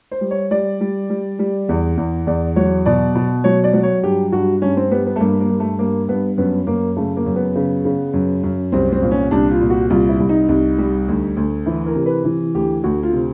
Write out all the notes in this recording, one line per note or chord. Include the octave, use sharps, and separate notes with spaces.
C5
G3
C#5
G3 D5
G3
G3
G3
E2
E2
E2 D5
F#3 C#5
B2 D5
B2
F#3 C#5
D5
F#3
C#5
G2 G4
G2 F#4
G2 C#4
C4
G3 B3
B3
A3
G2 A#3
A#3
G2
A3
G2 A#3
G2 B3
F#2 B3
F#2 A#3
C#3 A3
A#3
F#2
B3
C#3
C#3
F#2
F#2
C2 C4
C4
A#2
C#4
C2 D4
F4
A#2
F#4
C2 F4
E4
C2
D#4
C2
G3
D2
D2
E3 E4
A#4
C3
B4
E3
D2 G4
D2 F#4
F4
C3